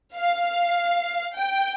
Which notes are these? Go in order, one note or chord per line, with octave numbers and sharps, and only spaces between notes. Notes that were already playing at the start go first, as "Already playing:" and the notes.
F5
G5